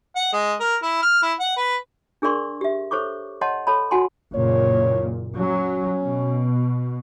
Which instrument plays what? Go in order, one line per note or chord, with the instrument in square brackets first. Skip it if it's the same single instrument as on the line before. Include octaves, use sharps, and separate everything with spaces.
[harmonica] F#5
G#3
A#4
E4
F6
E4
F#5
B4
[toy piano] D4 G#4 A#4 D5 C6 C#6
G4 E5
A4 C5 C#5 C#6 D6
C#5 D#5 F#5 A5 C6
A4 C#5 A5 B5
F#4 F#5 G#5 A5 C6
[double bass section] F#1 A#2 [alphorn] C#5
[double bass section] F#3 [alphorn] C#4
[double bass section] B2